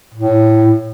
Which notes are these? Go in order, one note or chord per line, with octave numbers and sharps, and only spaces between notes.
A2